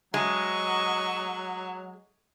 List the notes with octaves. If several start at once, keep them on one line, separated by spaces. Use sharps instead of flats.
F#3 G#3 D#5 C#6 E6